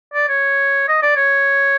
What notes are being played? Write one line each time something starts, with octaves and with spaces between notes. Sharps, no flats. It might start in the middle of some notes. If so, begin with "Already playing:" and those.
D5
C#5
D#5
D5
C#5